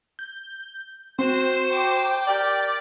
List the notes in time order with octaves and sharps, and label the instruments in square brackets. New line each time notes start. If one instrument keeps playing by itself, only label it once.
[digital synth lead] G6
[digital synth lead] C4 [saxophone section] F#4 C5
[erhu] G5 [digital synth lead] D6
[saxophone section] G4 A#4 D5